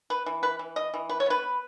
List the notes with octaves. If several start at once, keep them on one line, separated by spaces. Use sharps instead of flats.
B4
E3
B4
E3
D#5
E3
B4
C#5
B3 B4